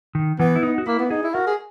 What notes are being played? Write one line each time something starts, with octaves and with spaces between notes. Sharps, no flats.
D#3
E3 B3
E4
D#4
F#4
A#3 E4
B3
D#4 G#4
E4
F#4 A#4
G#4